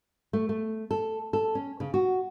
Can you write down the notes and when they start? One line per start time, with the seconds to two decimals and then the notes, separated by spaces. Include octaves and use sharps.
0.33 A3
0.49 A3
0.91 A4
1.33 A4
1.55 C#4
1.80 C#3
1.94 F#4